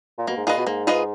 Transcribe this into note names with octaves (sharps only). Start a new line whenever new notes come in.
A#2
B2 A#3
G#2
A#2 F4 G#4 B4 D#5
B2
G#2 A#3
F4 G#4 B4 D#5